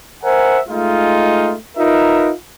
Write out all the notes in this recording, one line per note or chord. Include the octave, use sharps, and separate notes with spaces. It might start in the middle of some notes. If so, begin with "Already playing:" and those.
A#4 C5 E5 F#5 G#5
G#3 A3 D#4 F4
D#4 F4 A#4 B4 E5